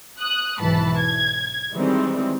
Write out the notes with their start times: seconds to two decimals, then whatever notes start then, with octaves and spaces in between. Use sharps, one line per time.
0.20 D#6 F#6
0.60 B1 G#2 E3 A5 B5
0.98 G#6
1.73 D#3 E3 G3 G#3 C4 D#4